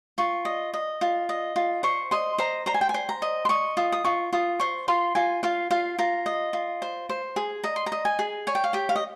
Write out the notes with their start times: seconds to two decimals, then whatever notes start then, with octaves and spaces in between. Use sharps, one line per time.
0.18 F4 C#6
0.45 D#5
0.74 D#5
1.01 F4
1.29 D#5
1.56 F4
1.83 C5 C#6
2.11 D#5 C6
2.38 C5 A#5
2.66 C5 A#5
2.74 G#5
2.81 G5
2.89 G#5
2.94 C5
3.09 A#5
3.22 D#5
3.45 C6
3.49 D#5 C#6
3.77 F4 D#6
3.92 D#6
4.04 F4 C#6
4.33 F4 D#6
4.60 C5 C#6
4.88 F4 C6
5.15 F4 G#5
5.43 F4 F5
5.71 F4 F5
5.98 F4 A#5
6.26 D#5
6.53 F4
6.82 C5
7.09 C5
7.36 G#4
7.63 D#5 A#5
7.76 C6
7.86 A#5
7.92 D#5
8.05 G#5
8.19 G#4
8.47 C#5 G#5
8.55 G5
8.64 F5
8.73 G4 G5
8.89 F5
8.96 D#5